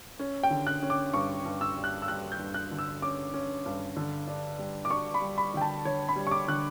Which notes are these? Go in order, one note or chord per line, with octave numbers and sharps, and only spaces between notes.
C#4
G5
D3
F#6
C#4
D6
G2 C#6
G2
E6
G3
F#6
E6
G3 F#6
G6
G2
F#6
D3
E6
C#4 D6
C#4
G2
D3
D4
G3
D6
D4 C#6
B5
G3
B5
D3 G5
A5
D3 C#5
B5
G3
C#6
D6
D3 F#6